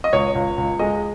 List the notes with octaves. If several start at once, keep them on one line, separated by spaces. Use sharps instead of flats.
D#5
C#2 C#5
C#2
C#2
G#3 D#5